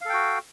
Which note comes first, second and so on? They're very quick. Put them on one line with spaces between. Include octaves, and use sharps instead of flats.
F5 A4 G5 F#4